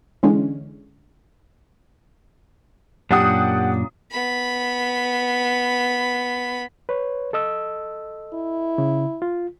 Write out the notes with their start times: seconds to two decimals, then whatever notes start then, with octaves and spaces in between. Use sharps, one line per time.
0.23 D3 E3 G#3 C#4
3.11 F#2 A#2 D4 G4 F#5 D#6
4.11 B3 B5
6.89 B4 C#5
7.33 A4 D#5 E6
8.33 E4
8.78 C#3
9.22 F4